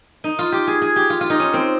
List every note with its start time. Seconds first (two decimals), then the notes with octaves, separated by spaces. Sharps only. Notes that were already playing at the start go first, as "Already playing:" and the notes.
0.24 D#4
0.39 F4
0.52 G4
0.67 G#4
0.82 G#4
0.96 G4
1.10 F4
1.21 F4
1.30 D#4
1.40 C#4
1.54 C4